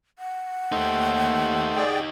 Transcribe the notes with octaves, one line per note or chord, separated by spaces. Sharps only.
F#5
D#2 A3 D#4 G4 C5
G#4 D5 G5